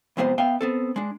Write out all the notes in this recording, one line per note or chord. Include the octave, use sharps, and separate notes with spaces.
C2 F2 C3 G#3 B3 C5
B3 E5 F5 G5
B3 C4 A4
G#3 D4